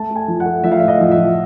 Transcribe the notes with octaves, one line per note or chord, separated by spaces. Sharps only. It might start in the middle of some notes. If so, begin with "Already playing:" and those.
Already playing: A3 A5
A3
G#5
F3
F#5
A3
F3 E5
F5
A2 E5
D#5
F3
E5
F3